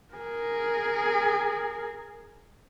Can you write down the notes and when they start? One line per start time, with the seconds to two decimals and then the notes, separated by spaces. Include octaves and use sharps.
0.14 G#4 A#4